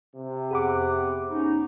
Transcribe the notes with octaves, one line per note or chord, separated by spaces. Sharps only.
C3
F2 B3 G#4 F#5 B5 D6
B3 C#4 D#4